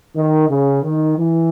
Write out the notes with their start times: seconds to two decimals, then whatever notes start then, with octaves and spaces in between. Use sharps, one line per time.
0.15 D#3
0.49 C#3
0.83 D#3
1.17 E3